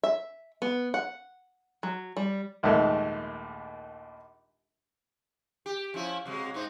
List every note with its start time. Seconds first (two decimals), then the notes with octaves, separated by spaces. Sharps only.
0.03 E5
0.62 B3
0.94 F#5
1.83 F#3
2.17 G3
2.63 A#1 D#2 G#2 G#3 A3
5.66 G4
5.94 F3 C#4 E4
6.25 C3 F#3 G#3
6.54 G#2 D#4 C5